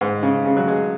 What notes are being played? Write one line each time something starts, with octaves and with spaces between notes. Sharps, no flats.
G#2
C#3
C#3
F#3
G#3